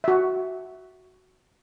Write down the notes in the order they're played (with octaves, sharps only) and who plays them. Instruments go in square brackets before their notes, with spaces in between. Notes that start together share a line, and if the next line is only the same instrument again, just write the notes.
[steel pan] F#4 E5